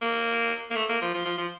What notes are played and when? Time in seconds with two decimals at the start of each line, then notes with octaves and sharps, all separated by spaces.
0.01 A#3
0.70 A#3
0.75 A3
0.89 A#3
1.01 F3
1.14 F3
1.25 F3
1.38 F3